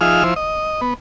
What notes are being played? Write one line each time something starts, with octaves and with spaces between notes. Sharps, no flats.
F3 D#4 F4 G#4 E5 F6
F3 E4 C5
D#5
B3